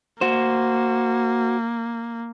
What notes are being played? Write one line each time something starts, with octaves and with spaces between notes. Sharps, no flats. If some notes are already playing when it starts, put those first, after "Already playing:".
A#3 F#4 C5